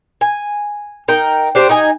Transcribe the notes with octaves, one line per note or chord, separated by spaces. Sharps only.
G#5
D#4 A#4 G5
D4 G4 C5
D#4 D#5 G#5